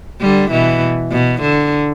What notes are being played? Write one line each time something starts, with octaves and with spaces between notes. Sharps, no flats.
D3 G3
B2 E3
B2
D3